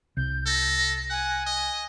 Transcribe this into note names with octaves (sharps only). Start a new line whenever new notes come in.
C2 G6
A4 A#6
F#5 G#5
D#5